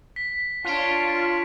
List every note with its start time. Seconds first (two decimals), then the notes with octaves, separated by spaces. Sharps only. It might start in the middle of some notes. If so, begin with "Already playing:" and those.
0.16 B6
0.65 D4 F4 C#5 B6 D7